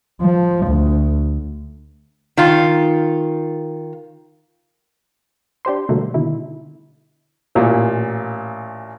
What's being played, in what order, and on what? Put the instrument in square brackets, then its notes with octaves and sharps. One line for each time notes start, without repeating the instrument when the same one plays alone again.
[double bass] F3
D2
[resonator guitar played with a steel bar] D#3 F4
[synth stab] D4 G4 C5 C6
B2 D3 F#3 G3 A3 A#3
B2 D3 D#3 E4
[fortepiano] A1 A#2